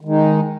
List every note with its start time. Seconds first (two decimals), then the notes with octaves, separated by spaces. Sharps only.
0.01 D#3
0.05 G#3
0.09 D#4